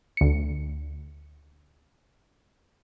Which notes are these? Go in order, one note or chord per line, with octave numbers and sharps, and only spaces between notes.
D2 C#7